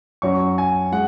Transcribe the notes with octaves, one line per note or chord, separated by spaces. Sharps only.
F#2 F#3 C#4 C#6
G#5
G#3 F#5